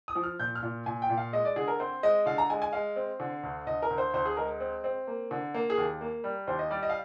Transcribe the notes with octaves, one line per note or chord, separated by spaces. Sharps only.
D#6
F3
F6
A#2 G6
F6
A#2
A#2 G#5
G5
A#2
F5
G#3 D#5
D5
D3 G#4
A#4
C4 C5
G#3 D#5
D3 F5
A#5
G#3 G#5
G#5
G#3 F5
C4
D3
D2
D2 D#5
A#4
D2
C5
D2 C5
G#4
G#3 A#4
C4
C4
A#3
D3
A#3
G#4
D#2
A#3
G3
D#2 C5
D#5
G3 D5
D#5
F5